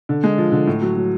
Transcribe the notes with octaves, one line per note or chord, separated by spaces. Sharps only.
D3
G#3
F3
D3
A2
F#3
F#3